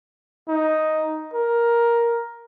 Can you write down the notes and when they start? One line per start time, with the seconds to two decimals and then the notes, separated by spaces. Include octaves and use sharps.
0.48 D#4
1.33 A#4